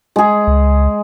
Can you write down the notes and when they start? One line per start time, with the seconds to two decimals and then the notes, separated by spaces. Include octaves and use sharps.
0.16 G#3 G#4
0.47 C#2